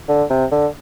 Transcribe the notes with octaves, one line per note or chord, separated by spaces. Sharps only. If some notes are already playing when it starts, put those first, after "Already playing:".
D3
C3
D3